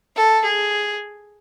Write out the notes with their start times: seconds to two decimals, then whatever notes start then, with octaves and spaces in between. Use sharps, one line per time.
0.16 A4
0.44 G#4